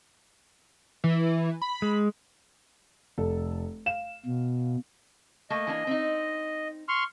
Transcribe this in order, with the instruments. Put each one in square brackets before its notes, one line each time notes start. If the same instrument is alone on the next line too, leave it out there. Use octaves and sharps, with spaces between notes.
[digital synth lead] E3
B5
[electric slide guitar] G#3
[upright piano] F1 A4
F5 E7
[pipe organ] B2
[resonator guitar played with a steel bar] A3 A#3 [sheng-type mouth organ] D#5
[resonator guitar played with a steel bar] E3 A#3 D4
C4 D#4
[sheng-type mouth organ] C6 C#6 F6